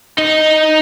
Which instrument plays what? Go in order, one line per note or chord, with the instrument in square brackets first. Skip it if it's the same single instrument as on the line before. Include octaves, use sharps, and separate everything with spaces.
[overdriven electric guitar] D#4 D#5